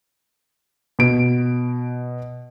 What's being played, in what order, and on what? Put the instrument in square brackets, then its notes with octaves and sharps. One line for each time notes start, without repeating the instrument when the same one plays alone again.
[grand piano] B2 D7